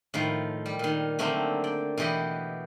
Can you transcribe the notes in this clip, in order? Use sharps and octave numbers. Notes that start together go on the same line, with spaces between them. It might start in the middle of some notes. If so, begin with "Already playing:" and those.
A2 D#3 F3
G3
A#2 D#3
D3 F#3 A3 A#3 C4 D4
D5 G5
B2 E3 G4 D#5 F#5